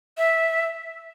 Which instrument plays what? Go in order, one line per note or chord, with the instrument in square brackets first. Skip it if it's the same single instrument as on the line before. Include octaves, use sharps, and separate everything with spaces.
[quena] E5